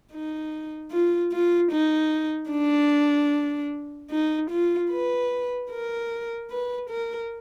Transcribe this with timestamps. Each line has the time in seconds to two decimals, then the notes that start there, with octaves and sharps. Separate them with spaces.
0.12 D#4
0.91 F4
1.32 F4
1.72 D#4
2.51 D4
4.11 D#4
4.50 F4
4.91 B4
5.70 A#4
6.50 B4
6.89 A#4